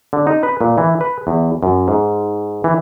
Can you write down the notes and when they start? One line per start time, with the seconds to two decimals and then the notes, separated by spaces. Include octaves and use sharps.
0.13 D3
0.27 D#4
0.43 B4
0.61 A#2
0.78 E3
1.01 B4
1.27 E2
1.63 F#2
1.88 G#2
2.64 E3